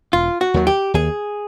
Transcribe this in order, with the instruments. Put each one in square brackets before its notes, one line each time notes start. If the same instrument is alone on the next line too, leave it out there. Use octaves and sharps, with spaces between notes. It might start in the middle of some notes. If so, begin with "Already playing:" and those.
[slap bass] E1 [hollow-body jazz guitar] F4
[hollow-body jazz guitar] F#4
[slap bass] D#2 D#3 F#3
[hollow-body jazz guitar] G4
[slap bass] D#2 [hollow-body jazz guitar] G#4